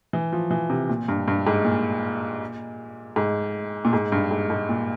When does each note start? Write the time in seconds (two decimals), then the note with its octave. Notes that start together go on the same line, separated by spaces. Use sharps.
0.13 E3
0.32 F3
0.51 E3
0.70 C3
0.89 A#2
1.08 G2
1.28 G2
1.47 G#2
1.64 A#2
3.16 G#2
3.85 A#2
3.93 G#2
4.12 G2
4.31 G#2
4.50 G#2
4.69 A#2